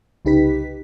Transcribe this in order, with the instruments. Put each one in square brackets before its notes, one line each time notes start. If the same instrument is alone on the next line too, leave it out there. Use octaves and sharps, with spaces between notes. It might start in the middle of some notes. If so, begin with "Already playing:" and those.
[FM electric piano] C2 C#3 D#4 G4 B4 B6